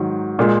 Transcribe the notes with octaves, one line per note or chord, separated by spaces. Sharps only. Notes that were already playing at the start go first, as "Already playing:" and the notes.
Already playing: G#2 D#3 F#3
A#2 G#3